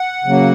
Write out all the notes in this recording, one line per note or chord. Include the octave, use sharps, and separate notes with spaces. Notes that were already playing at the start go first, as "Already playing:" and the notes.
Already playing: F#5
C#3 F#3 A#3